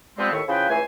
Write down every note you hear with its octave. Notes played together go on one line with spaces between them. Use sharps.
F3 G3 G#3 B3 C4
D#2 A2 D#3 E5 C#6
C#3 F3 E4 B4 G5
C#2 E3 A3 C5 G#5